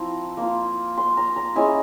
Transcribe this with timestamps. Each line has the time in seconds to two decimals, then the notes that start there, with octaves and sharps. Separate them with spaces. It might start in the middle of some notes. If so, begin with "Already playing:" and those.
Already playing: F3 C4 E4 A#5
0.37 A#3 F4
0.97 C6
1.17 A#5
1.36 A#5
1.55 G#3 C#4 E4 G#5